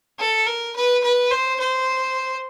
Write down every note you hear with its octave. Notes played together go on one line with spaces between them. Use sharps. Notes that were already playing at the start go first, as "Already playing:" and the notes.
A4
A#4
B4
B4
C5
C5